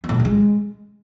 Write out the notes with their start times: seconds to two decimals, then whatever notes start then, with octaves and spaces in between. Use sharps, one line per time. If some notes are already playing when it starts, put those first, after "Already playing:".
0.04 B3
0.09 A2
0.14 C3
0.20 A3
0.25 G#3